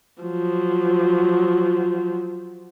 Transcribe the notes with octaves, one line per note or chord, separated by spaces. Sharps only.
F3 F#3